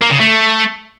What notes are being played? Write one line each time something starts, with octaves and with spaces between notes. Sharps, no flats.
A#3
C#3
A3